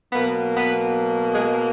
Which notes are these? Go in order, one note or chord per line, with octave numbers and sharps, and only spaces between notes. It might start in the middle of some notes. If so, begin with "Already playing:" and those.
B2 F#3 A#3 B3 B4
B3 B4
G#3 G#4